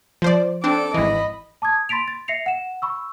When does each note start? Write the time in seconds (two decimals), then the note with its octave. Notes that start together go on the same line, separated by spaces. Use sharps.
0.22 F3 C5 D5
0.64 C4 D4 A4 D6
0.94 G#1 E3 D#5 B5
1.62 A5 D6 D#6 G#6
1.89 B5 C6 A6 B6 D7 F7
2.08 A6
2.28 E5 A#6 C7 C#7 F7
2.46 F#5 E7
2.82 B5 C#6 E6